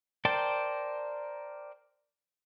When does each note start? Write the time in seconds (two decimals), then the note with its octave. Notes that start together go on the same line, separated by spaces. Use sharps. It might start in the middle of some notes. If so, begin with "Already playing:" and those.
0.25 A#4 C5 D5 G5 A5